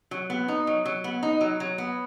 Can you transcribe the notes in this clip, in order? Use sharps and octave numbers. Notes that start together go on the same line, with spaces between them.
F#3
B3
D#4
F#3
F#3
B3
D#4
F#3
F#3
B3